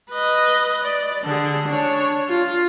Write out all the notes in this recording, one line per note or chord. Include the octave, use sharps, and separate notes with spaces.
B4 D#5
D5
D3 G#4
D4 C#5
F4